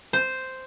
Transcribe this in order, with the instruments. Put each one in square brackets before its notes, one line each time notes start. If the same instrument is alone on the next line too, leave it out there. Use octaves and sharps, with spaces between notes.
[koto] C5